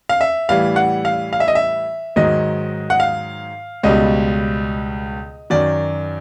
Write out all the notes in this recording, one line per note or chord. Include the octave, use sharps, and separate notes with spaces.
F5
E5
A2 E3 G3 F5
F#5
F5
F5
E5
D#5
E5
G#2 D#3 F#3 D#5
F#5
F5
C#2 B2 G3 D#5
F#2 D#3 F#3 D5